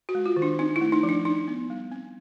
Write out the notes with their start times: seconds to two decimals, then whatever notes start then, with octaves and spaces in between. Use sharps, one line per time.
0.09 F#4
0.15 G#3
0.26 F4
0.36 D#3
0.42 D4
0.59 C4 D#4
0.76 E4
0.81 A3
0.92 D#4
1.03 F3
1.09 D4
1.25 D4 D#4
1.48 B3
1.70 G3
1.92 C4